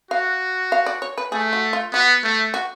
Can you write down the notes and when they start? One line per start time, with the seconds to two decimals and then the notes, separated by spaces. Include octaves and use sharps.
0.11 F#4 F5
0.72 F5
0.86 D5
1.02 C#5
1.18 B4
1.32 A3 G#4
1.53 F#4
1.73 F4
1.93 B3 F#4
2.24 A3
2.54 F#4